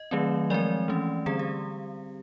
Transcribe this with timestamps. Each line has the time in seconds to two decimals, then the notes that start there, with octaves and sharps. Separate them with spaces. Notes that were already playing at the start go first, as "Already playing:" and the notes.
Already playing: D#5
0.11 D#3 F#3 A3 C4
0.50 F3 G#3 C4 D5
0.88 E3 A3 C#4
1.26 D3 G3 C4 G#4
1.39 G4